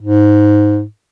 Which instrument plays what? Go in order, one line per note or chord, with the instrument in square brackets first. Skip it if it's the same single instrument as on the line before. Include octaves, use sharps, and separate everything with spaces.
[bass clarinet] G#2